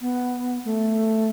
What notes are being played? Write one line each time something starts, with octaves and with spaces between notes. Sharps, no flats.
B3
A3